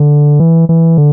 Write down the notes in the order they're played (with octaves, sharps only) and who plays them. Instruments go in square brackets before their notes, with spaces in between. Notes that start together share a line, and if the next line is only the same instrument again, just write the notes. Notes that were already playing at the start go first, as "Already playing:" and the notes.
Already playing: [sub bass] D3
E3
E3
D3